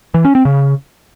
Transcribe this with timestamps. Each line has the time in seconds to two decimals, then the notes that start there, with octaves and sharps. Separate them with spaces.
0.14 E3
0.25 C#4
0.35 C4
0.45 C#3